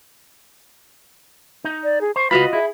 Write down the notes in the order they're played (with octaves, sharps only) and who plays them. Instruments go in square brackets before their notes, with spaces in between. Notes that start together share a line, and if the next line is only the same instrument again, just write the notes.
[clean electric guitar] D#4
[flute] D5
G#4
[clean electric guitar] C5 [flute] C#6
[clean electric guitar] C#2 F5 B5 [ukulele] F4 F#4 D#5 [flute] B4
[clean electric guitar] E4 [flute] G#4